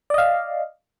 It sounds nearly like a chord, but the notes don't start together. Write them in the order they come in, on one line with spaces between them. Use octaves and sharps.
D5 D#5 F5